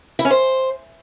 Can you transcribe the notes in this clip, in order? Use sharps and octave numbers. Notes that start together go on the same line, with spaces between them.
E4
C#4
C5